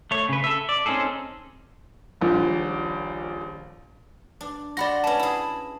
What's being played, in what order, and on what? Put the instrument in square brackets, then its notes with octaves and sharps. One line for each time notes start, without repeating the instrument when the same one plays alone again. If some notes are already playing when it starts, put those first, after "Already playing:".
[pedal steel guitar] A3 C#5
C#3 B4
A4 E5
D5
C4 C#4 D#4 G#4 A4
[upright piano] D#1 A#1 F3
[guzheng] D4
[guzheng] F#4 F#5 C6 [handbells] D5 B5 A#6
[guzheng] C#4 B4 [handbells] A5 B5
[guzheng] E4 G#4